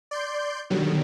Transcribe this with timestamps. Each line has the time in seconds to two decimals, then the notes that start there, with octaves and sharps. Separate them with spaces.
0.11 D5 C6 G6
0.70 B2 D3 D#3 F#3 G3